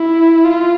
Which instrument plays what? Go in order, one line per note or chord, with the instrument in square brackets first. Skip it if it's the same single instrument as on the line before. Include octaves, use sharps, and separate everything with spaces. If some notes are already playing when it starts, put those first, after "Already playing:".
Already playing: [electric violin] E4
F4